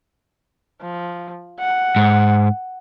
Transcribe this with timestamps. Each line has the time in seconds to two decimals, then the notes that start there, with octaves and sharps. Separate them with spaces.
0.81 F3
1.59 F#5
1.96 G#2